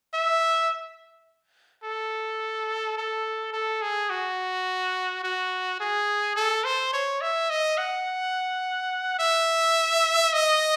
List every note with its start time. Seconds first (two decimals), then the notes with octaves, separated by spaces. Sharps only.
0.14 E5
1.84 A4
2.97 A4
3.53 A4
3.82 G#4
4.10 F#4
5.24 F#4
5.80 G#4
6.36 A4
6.64 C5
6.93 C#5
7.21 E5
7.50 D#5
7.78 F#5
9.19 E5
10.33 D#5